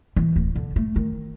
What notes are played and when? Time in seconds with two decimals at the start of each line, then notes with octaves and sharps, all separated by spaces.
0.16 E3
0.36 D1
0.55 D3
0.76 A3
0.96 D#3